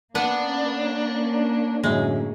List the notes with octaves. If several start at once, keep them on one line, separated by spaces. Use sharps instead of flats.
A#3 B3 C#4 D4
F#2 A2 D3 G#3